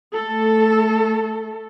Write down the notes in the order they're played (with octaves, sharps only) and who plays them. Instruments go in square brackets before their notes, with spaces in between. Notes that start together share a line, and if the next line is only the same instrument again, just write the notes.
[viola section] A3 A4